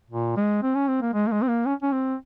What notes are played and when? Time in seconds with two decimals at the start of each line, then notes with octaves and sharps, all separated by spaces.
0.10 A#2
0.36 G#3
0.63 C4
0.75 C#4
0.87 C4
1.02 A#3
1.13 G#3
1.27 A#3
1.32 G#3
1.42 C4
1.48 A#3
1.66 C#4
1.83 C#4
1.92 C4